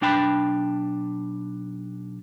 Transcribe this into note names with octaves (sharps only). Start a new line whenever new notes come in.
B1 D4 G5 A5 B5